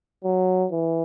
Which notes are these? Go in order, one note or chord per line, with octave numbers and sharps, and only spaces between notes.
F#3
E3